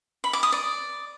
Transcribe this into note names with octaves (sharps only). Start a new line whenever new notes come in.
B5
D6
D#6
D5